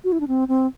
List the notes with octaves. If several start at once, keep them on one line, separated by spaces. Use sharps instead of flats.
F#4
E4
D4
C4
C4